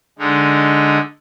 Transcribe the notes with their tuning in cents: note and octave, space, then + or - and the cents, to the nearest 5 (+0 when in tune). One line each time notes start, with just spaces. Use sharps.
D3 +0 G#3 +0 D#4 +0